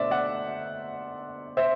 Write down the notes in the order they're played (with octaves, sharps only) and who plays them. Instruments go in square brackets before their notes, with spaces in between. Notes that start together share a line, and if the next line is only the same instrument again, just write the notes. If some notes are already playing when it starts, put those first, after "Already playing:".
Already playing: [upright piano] B2 A3 D4 C5 D5 E5
D5 F#5
C5 E5